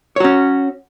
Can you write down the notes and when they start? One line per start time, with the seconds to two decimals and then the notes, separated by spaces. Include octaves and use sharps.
0.16 C#5
0.20 F#4
0.24 C#4